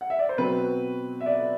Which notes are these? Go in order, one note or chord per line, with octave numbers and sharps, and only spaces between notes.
F#5
E5
D5
C5
B2 F#3 C4 B4
E5
D5